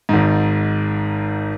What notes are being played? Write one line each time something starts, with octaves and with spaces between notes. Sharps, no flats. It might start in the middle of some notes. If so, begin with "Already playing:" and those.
G#1 G#2